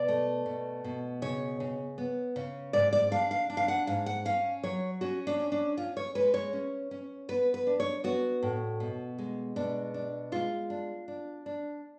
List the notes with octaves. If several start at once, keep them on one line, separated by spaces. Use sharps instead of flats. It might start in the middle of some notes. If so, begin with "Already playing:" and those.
Already playing: B2 D5
A3
B2
B2
C#3 C#5
C#3
B3
C#3
G#2 D5
D5
D4 F5
F5
D4
F5
F#5
G#2 F5
F#5
C#4 F5
F#3 C#5
C#4 F#4
D4
C#4
D4
C#4 F4
C#5
G#3 B4
C#5
C#4
C#4
B3 B4
B4
D4
C#5
B3 F#4
A2
B2
G#3
B2 D4
D4
G#3 F4
D4
D4
D4